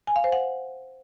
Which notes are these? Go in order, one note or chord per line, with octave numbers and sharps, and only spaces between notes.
G#5
F5
C5
F#5